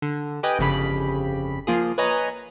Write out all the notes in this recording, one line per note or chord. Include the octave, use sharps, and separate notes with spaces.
D3
G4 B4 D#5 G5 G#5
G1 F2 C#3 G4 B5 B6
F3 A#3 F4 G#4
B4 C#5 D#5 G#5 A#5